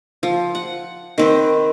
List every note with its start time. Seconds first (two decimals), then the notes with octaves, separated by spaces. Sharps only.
0.23 F3
0.55 F#5
1.18 D#3 C4 B4